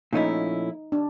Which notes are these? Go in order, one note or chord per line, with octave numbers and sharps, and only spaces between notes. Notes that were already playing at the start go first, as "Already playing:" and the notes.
A#2 F3 A3 C#4 D#4 E4
D4